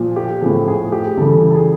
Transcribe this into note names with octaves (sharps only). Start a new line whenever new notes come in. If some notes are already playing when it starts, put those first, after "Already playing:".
Already playing: A#2 F3
G4
A2 F3 G#4
G#4
G4
C#3 E3 G3 A4
A4
G#4